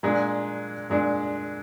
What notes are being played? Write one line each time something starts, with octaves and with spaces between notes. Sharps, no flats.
A#2 G#3 D4
A#2 G#3 D4